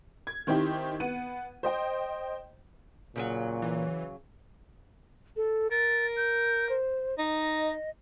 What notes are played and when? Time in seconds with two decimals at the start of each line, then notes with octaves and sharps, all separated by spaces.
0.27 G#6
0.47 D#3 C4 D#4 E4 G4
1.00 B3 F#5 D#7
1.63 C5 D#5 G5
3.16 A#2 C#3 F3 F#3
3.62 E3
5.37 A4
5.71 A#4 A6
6.16 G6
6.69 C5
7.18 D#4 D#5